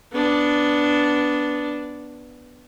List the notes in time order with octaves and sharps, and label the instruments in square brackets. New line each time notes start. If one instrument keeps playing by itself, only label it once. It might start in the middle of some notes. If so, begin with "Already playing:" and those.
[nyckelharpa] B3 D4